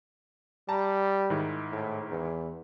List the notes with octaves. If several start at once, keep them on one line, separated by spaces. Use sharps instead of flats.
G3 A5 A#5
G#2 D#3 E4
A2
E2